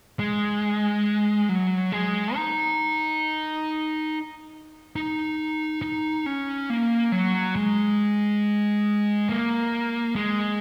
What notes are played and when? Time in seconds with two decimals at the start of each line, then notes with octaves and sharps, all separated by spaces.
0.19 G#3
1.49 F#3
1.92 G#3
2.36 D#4
4.96 D#4
5.82 D#4
6.26 C#4
6.70 A#3
7.12 F#3
7.56 G#3
9.29 A#3
10.15 G#3